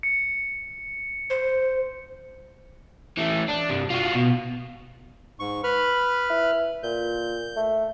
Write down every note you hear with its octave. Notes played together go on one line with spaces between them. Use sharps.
C#7
C5
E3 A3
D4
G2 C3
F4 F#4
B2
G#2 C#6
B4 B5 F6
E4
A#2 G6
A3